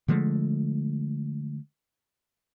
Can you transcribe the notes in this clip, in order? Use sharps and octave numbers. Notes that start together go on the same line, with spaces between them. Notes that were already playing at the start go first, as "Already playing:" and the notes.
D3 F3 G#3 A3